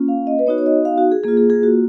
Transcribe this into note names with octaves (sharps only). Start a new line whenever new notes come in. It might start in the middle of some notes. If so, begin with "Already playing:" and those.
Already playing: A#3 C#4 F4
F5
D#5
B4
B3 D#4 F#4 C#5
C#5
D#5
F5
F#4
G#4
A#3 F4 G#4
G#4
G#4
F#4